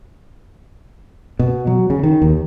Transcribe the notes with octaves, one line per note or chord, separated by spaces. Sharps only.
B2
F#3
C#3
D#3
D#2